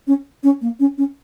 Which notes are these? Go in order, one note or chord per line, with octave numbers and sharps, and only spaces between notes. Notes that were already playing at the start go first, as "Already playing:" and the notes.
C#4
C#4
A#3
C#4
C#4